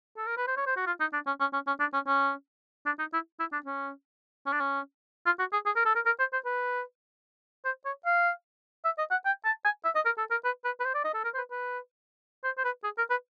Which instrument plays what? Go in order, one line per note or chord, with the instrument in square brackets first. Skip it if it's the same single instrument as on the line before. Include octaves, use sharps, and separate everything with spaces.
[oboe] A4
A#4
B4
C5
C#5
C5
F#4
F4
D#4
D4
C#4
C#4
C#4
C#4
D4
C#4
C#4
D4
D#4
E4
E4
D4
C#4
C#4
D4
C#4
F4
F#4
G#4
G#4
A#4
A4
A#4
A#4
C5
C5
B4
C5
C#5
F5
E5
D#5
F#5
G5
A5
G#5
E5
D#5
A#4
A4
A#4
B4
B4
B4
C5
D5
D#5
A4
A#4
C5
B4
B4
C5
C5
B4
G#4
A#4
B4